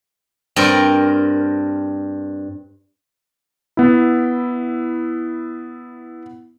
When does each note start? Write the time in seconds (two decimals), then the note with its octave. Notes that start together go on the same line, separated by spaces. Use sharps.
0.56 G2 C4 A#4
3.77 B3 E4